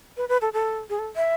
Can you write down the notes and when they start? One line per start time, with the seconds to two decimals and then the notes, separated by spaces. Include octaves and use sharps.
0.17 B4
0.29 B4
0.42 A4
0.53 A4
0.89 G#4
0.99 A4
1.16 E5